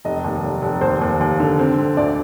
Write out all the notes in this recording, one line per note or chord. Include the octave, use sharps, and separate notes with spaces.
F1 D#5
D#2
F1
F1
D#2 C5
D#2
D#2
D3
C4
D3
D2 D5